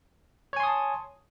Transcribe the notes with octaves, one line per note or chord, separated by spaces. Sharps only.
C#5 G#5 A5 C6 D#6